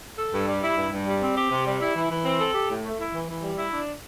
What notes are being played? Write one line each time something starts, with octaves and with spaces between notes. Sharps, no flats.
A4
G2
G3
E4
G2
G2
G3
C4
G4
C3
G3
E4
E3
E3
C4
A4
G4
A2
A3
E4
E3
E3
G3
E4
D4